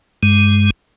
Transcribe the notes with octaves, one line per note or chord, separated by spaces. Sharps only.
G2 G#3